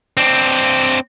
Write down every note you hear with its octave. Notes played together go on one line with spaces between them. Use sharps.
C4 D4